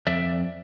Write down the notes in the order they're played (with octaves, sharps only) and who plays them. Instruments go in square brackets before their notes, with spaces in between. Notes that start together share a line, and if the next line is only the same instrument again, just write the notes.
[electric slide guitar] F2 D5 E5